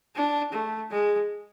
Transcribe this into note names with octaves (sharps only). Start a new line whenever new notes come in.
D4
A3
G#3